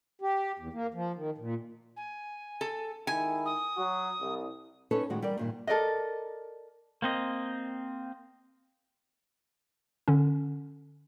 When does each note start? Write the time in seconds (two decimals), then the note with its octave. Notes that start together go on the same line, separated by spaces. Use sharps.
0.22 G4
0.59 E2
0.73 A#3
0.94 F3
1.16 D#3
1.38 A#2
1.97 G#5
2.61 A4
3.07 D#3 G#3 E4 G#5
3.46 D#6
3.77 F#3 F#4
4.21 C2
4.91 C#4 D#4 A4 B4 C#5
5.10 A2 D#3 F#3 G#3 F#4
5.22 E3 G3 G4 A#4 D5
5.38 G2 A#2 D#3
5.67 A4 A#4 D5 D#5
7.02 A#3 C4 D#5
10.08 D3 C#4